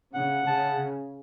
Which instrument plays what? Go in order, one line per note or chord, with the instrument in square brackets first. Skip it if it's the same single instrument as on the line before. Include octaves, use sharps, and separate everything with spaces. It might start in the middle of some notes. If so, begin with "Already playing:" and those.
[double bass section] C#3 [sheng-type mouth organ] F#5
[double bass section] C#3 [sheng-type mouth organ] A5